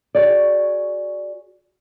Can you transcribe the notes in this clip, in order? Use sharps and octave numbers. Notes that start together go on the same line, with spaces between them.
F#4 G#4 C#5 D5